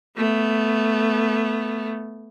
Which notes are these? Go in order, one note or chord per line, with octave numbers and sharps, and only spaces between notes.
A3 B3